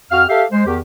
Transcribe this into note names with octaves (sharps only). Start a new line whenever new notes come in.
F2 F#4 F5 F6
G4 A4 E5 F5
G#3 C5
E2 D#3 G4